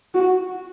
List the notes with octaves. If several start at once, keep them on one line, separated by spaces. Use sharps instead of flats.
F#4